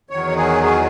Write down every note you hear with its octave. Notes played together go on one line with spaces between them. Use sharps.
E2 D#3 F#3 C#5
G#4
G#4